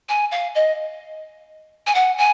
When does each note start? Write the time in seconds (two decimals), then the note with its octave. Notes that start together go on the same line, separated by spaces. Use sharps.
0.09 G#5
0.31 F5
0.55 D#5
1.87 G#5
1.94 F#5
2.18 G#5